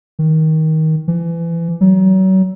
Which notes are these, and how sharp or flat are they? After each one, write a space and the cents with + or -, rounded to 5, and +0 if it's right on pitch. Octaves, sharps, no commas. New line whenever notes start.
D#3 +20
E3 +30
F#3 +35